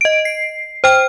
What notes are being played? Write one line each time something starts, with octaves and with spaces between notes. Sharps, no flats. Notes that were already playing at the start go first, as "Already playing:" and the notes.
D#5 D7
C7
C5 G5 F6